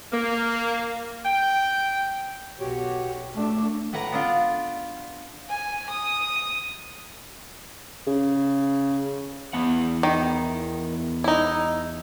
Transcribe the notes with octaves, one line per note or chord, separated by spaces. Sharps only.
A#3
G5
B1 F#4 G4 C#5
A2 A3 D4
A2 B4 F#5 A#5
B3 D4 F4
G#5
D#6
C#3
E2 B3 F#5
D#3
D#4 E4